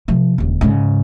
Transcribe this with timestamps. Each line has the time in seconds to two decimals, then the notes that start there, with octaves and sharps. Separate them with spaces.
0.08 C3 F3
0.38 D#1 C#2
0.61 G#2 C#3